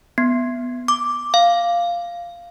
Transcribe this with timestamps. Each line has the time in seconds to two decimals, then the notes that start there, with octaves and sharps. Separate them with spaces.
0.18 B3
0.88 D6
1.34 F5